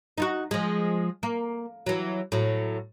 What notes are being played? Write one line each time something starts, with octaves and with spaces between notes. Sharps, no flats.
D#4 F4 F#4
F3 G#3
A#3
E3 F#3
A2 F#3